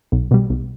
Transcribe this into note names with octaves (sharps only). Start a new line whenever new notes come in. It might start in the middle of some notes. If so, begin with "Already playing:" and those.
B1
B2 G3
B1